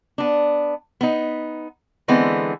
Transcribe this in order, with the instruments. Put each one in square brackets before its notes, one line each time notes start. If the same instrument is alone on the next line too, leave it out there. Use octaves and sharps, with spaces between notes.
[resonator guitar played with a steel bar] B3 D4
B3 D#4
D3 E3 G#3 B3 C4